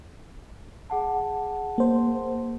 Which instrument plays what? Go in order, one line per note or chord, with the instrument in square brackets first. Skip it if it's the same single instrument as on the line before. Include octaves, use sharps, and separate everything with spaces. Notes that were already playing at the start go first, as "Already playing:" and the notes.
[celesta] G#4 F#5 A5
[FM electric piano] A#3 C5